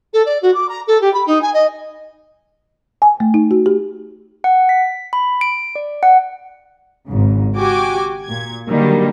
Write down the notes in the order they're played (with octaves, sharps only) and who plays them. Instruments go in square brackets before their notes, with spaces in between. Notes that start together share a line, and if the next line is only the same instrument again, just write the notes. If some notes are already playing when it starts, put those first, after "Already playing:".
[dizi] A4
D5
F#4
D6
A#5
A4
G4
B5
D#4
G#5
D#5
[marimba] G#5
A3
D#4
F#4
G4
[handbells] F#5
B6
B5
D7
D5
F#5
[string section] G#1 G#2 C#3
F#4 G4 G5 G#5 D6
A#2 G#6
D3 D#3 F#3 G3 A#3